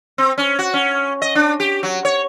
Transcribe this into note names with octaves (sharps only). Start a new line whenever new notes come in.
C4
C#4
F#4
C#4
D#5
D4
G4
F#3
C#5